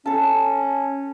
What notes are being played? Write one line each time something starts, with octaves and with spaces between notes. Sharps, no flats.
C#4 A4 A5